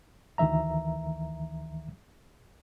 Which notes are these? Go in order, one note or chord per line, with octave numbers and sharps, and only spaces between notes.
D2 D#3 E3 E5 A#5